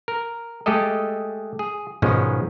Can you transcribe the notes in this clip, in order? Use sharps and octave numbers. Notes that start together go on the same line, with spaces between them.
A#4
G#3 A3 G4 A4 D#5
G#4
G#2 B2 D#3 F3 G#3 C#4